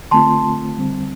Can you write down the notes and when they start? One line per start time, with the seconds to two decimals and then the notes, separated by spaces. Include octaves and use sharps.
0.11 D3 A3 C4 F4 A5 C6
0.76 D3 G3 C4